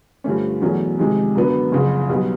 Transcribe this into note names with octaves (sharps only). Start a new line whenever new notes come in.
G2 D3 F3 A3 C#4
E2 B2 F#3 A3 C#4
F2 C3 D#3 G#3
F#2 D3 F#3 B3 D4
F#1 F2 C#3
B1 B2 G3